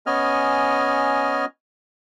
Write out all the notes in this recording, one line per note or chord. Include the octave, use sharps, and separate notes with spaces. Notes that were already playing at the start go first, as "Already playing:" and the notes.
B3 C#4 D#5 G#5 F6